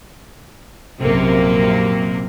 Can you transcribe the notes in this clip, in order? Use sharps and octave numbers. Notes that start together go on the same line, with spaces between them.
A#1 F#2 C3 A#3